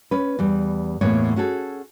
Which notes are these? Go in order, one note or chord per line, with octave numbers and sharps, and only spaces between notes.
C#4 B4
E2 G3
E2 A2 A#3 B3 C#5
C#4 F#4 G#4 A4